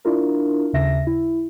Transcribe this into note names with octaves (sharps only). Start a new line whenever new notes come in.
D4 E4 F4 A#4
D#2 C#3 E5 A#6
E4